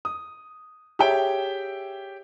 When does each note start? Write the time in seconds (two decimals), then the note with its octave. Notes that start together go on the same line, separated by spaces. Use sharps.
0.05 D#6
0.99 G4 G#4 C#5 E5 G5